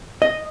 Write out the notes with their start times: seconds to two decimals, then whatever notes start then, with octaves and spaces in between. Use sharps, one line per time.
0.22 D#5